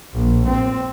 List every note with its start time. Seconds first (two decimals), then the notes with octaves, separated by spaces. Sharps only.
0.14 A#1
0.46 C4